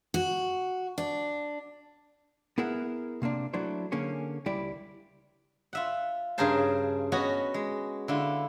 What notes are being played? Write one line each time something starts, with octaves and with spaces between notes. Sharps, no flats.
F#4
D4
B3 E4 G#4 A#4 E5 F#5
C3 A#3 C4 D4
F#3 A3 D4 E4 C5
D3 A#3 C#4 G#4 C#5
C#2 G3 E4 G4 D5
F4 E5 F#5
G2 C#3 G#4 A#4 C5 A5
B3 C#4 F#4 C#5 D#5
G#3
D3 E4 F4